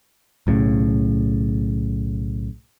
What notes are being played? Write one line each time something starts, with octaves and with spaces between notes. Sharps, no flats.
B1 A2 C#3